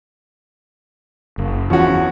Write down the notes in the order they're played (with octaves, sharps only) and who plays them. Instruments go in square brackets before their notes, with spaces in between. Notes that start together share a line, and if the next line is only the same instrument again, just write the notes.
[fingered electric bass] F#1
[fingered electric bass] E2 [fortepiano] F3 C#4 F#4